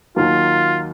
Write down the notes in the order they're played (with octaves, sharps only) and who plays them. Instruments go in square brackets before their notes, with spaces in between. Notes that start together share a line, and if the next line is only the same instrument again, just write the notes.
[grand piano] D#2 D#3 F#3 A#3 [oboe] F4